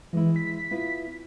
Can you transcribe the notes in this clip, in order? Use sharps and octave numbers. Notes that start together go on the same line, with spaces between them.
E3 G#3 E4
B6
B3 E4 F4